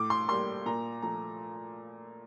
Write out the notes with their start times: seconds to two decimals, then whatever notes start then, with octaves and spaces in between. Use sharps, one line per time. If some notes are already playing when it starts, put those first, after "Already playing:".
Already playing: A2 D6
0.10 C6
0.28 G3 A#3 C6
0.66 A#2 A#5
1.02 F3 A3 A#5